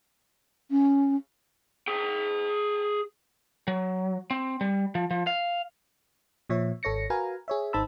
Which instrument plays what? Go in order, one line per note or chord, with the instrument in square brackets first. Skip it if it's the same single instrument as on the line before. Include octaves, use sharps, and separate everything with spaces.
[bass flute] C#4
[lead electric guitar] G#4 G5
F#3
C4
G3
F3
F3
F5
[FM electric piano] A#2 F3 C#5 E5
G#1 A4 C#5 A#6 C#7
F#4 A#4 B4 F5 G#5 A#5
G#4 C#5 E5
G#1 D#4 C5 A5 B5 E6